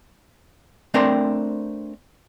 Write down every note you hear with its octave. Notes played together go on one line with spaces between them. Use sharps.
A3 C4 D4 A#4 C5 G5